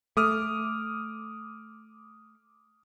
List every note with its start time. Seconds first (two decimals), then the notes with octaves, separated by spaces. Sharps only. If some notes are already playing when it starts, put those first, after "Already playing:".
0.17 A3 D6 D#6 F6